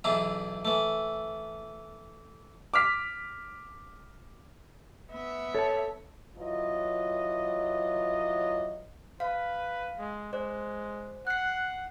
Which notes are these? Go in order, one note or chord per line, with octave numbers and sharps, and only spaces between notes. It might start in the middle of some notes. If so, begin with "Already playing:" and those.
B1 E2 E3 D4 E4 A#5
E3 A3
D6 F6 B6
B3 E5
A4 C#5 A5
E3 F#3 F4 C#5 D#5
B4 F5
G#3
G#3 C5 D5
F#5 F#6 C7